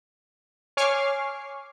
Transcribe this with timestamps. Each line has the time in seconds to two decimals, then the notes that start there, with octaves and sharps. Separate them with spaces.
0.77 C#5 G#5 C#6 D6 F6 C7